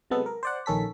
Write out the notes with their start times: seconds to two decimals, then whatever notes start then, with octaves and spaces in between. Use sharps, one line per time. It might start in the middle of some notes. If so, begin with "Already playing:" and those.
0.10 C3 F#3 G#3 B3 A4
0.26 A#4
0.43 C5 D5 F#5
0.66 A#1 D#3 C#4 A4 B6